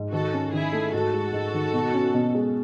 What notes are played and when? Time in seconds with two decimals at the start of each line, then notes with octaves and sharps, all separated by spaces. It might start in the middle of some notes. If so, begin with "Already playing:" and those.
Already playing: G#2
0.13 D#3 F#4 A4
0.33 C#4
0.52 D#3 E4 G#4
0.73 A3
0.93 G#2 F#4 A4
1.14 G#3
1.33 G#2
1.54 D#3
1.73 B2
1.94 C#4
2.14 B2
2.35 G#3